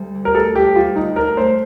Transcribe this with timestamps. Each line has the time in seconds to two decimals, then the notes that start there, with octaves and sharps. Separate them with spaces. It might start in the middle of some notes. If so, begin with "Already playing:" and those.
Already playing: D2 G3
0.15 D3
0.25 A#4
0.35 D2 A4
0.55 D2 G4
0.76 G3 F4
0.96 D3 D#4
1.16 D4 A#4
1.37 A3 C5